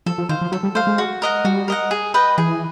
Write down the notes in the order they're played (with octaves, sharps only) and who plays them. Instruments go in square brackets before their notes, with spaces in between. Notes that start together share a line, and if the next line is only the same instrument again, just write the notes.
[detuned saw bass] F3 [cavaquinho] A4
[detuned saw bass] F3
[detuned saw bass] D#3 [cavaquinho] C5 F5
[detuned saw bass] F3
[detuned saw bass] F#3 [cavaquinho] A4
[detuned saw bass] G3
[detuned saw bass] A3 [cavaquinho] C5 F5
[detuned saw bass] G#3
[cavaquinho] F#4
A#4 D#5 F#5
[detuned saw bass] G3 [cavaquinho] F#4
[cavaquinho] A#4 D#5 F#5
G#4
B4 D#5 G5
[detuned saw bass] E3 [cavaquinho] G#4